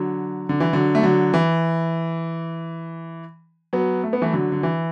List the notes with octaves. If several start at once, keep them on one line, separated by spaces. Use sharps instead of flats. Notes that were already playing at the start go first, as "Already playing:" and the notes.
Already playing: D3 F#3
D3
E3
D3 F#3
A3
D3 F#3
E3
F#3 B3
A3
B3
E3 A3
D3 F#3
D3
E3